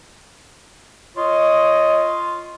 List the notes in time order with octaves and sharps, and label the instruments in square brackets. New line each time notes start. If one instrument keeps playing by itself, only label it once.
[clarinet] F4 [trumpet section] C#5 D#5